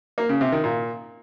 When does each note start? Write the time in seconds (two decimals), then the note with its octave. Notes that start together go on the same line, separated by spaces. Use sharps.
0.18 A#3
0.29 C#3
0.41 C3
0.52 D#3
0.64 A#2